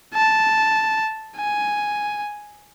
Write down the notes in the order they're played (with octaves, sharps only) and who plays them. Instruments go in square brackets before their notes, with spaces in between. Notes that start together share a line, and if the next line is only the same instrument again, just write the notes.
[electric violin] A5
G#5